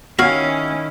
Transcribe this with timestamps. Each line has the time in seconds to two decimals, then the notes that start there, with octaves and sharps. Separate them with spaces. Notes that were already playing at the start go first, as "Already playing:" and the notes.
0.19 D#3 C#4 E4 F#4 F5